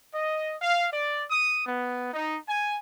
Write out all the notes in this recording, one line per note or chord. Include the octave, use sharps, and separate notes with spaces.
D#5
F5
D5
D#6
B3
D#4
G#5